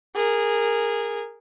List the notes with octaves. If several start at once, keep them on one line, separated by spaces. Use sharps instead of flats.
G#4 A#4